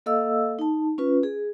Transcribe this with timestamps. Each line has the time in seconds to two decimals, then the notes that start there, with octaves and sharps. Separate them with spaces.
0.06 A#3 A4 D#5 F5 E6
0.59 D#4 A5
0.98 C#4 F4 B4
1.23 G#4